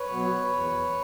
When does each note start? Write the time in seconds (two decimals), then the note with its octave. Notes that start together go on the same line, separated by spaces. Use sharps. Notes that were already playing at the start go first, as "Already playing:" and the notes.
Already playing: B4 C#5
0.10 B2 F#3 B3
0.53 E2